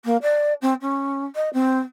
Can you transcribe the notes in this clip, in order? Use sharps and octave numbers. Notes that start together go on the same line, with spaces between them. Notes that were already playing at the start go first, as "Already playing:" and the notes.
A#3
D5
C4
C#4
D#5
C4